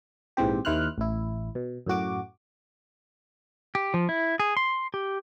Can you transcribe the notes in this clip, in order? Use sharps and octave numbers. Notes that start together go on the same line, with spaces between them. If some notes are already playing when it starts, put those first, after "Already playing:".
A#1 G#2 E3 C4 G4
D#2 D#3 E4 C5 F6 F#6
A1 E4
B2
F#2 A2 F#4 D6
G4
F3
E4
G#4
C6
G4